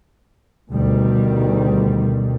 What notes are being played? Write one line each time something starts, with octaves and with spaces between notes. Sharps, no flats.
D2 B2 D#3 G3